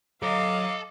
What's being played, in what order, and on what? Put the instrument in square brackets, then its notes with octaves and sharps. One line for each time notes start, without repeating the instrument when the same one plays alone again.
[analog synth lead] F#3 [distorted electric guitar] A4 A#5 [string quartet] D#5 D6 [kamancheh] F5